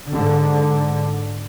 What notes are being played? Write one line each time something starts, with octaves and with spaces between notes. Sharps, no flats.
G#2 D3